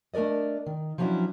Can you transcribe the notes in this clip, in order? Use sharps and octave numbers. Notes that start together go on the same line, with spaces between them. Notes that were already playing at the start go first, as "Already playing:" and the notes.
A3 D4 A#4 D5 D#5
D#3
F3 F#3 C#4 D4 E4 F#4